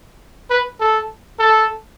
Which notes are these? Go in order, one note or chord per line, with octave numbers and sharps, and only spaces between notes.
B4
A4
A4